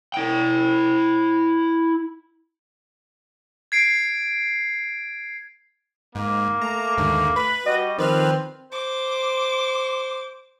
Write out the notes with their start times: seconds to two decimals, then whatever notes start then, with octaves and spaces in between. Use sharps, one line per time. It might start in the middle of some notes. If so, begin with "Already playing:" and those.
0.14 E4 G5
3.72 G#6 C7 D7
6.15 G#2 A#3
6.62 A3 A#5
6.97 D#2 G#2 D3
7.36 B4 B5
7.66 G3 F#4 D#5
7.98 D#3 F3 C4 B4 F6
8.72 C5 D6